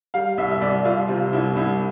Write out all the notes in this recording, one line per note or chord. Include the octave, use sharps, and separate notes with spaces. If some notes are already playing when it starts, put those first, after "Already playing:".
G3 F5
C2 E5
E5
C2 D5
C2 F4
C3 F4
C2 E4
C2 E4